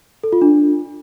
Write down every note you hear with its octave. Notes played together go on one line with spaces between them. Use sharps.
A4
F4
D4